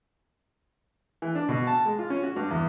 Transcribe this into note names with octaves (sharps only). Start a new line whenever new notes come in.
E3
D4
B2
A5
G#3
F4
C#4
F#4
G2
E2